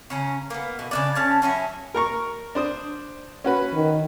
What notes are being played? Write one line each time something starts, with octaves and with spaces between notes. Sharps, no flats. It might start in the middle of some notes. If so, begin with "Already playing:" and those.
C#3 C#4 A#5
A#3 B3
B2
C#3 D4 D5
C#3 C#4 A5
F#3 C#4 D#4 E4
A#4 A#5 C#6
D4 C5 D#6
C#4 F#4 B4
D#3